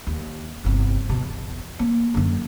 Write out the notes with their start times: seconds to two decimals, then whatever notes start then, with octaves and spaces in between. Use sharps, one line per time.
0.07 D#2
0.64 G1 C2
1.09 B2
1.22 E2
1.79 A#3
2.14 F#2 D3